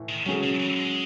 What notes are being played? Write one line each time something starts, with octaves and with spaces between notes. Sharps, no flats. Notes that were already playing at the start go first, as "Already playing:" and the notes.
Already playing: A2 E3
D#3
C#3 F#3 C#4 G#4
C#3
E3
G#3